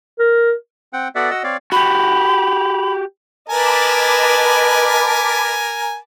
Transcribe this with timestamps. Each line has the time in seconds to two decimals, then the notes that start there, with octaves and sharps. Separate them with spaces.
0.19 A#4
0.93 C4 F#5 G5
1.15 B3 F#4 A4 D5 E5 F#5
1.31 F#4 D#5 F#5 E6
1.44 C4 C#5 D5 F5
1.72 F#4 G4 B5
3.49 A#4 B4 D#5 G#5 A5 B5 D6